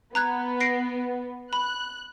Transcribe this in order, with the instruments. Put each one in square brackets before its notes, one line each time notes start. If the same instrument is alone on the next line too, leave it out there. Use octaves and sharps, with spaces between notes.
[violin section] B3 [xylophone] A#5 F#6 G#6
[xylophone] A#6 C7 D7
[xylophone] B5 [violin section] F#6